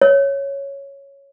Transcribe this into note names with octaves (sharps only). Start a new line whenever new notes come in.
C#5